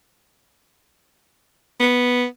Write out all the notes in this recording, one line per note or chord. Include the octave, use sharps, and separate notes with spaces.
B3